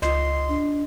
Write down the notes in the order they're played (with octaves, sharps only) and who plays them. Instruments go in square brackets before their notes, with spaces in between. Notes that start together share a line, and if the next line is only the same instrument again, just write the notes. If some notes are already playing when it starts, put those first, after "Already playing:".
[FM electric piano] C#2 [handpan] F4 D#5 [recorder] C6
[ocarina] D4